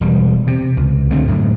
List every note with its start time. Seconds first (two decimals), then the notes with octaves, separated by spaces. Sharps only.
0.01 E1 G3
0.47 C3
0.77 C#2
1.10 D2 D3 A3 C4
1.28 F#2 A2